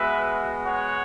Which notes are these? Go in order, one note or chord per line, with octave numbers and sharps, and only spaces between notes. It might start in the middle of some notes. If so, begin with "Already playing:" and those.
Already playing: G#3 B3 F#4 B4 E5
C#5 F#5